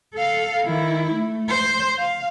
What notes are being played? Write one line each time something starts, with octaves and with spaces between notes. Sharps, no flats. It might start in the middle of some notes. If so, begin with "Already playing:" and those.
A4 F5
D#3 E4
A3
C5
F5